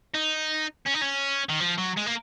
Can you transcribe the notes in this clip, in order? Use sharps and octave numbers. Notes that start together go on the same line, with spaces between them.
D#4
C#4
D#4
C#4
D#3
F3
F#3
G#3
A#3